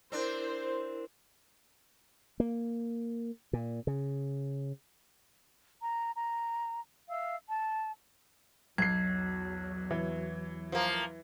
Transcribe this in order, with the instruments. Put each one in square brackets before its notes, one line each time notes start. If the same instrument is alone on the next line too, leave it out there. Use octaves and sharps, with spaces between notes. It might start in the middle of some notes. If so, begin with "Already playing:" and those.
[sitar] C4 D4 [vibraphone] E4 A#4 [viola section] C5
[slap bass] A#3
A#2
C#3
[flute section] A#5
A#5
E5 F5 E6
A5
[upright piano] B1 C7 [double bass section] E2 F#3 [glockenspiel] G#6
[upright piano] E3
[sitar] F3 A#3